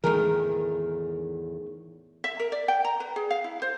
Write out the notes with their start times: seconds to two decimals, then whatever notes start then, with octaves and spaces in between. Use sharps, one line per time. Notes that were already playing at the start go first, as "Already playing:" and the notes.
0.04 E2 A2 D#3 E3 G#3 G#4 A#4
2.24 E5
2.40 A#4
2.52 D5
2.68 G5
2.85 A#5
3.00 B4
3.16 G#4
3.30 F5
3.44 E4
3.62 C5